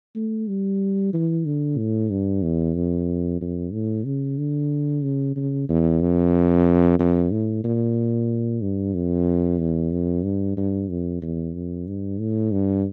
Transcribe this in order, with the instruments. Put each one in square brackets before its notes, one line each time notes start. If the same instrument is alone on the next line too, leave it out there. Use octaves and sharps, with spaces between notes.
[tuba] A3
G3
E3
D3
A2
G2
E2
F2
F2
A2
C#3
D3
C#3
C#3
E2
F2
F2
A2
A#2
G2
F2
E2
F2
G2
G2
F2
E2
F2
G2
A2
G2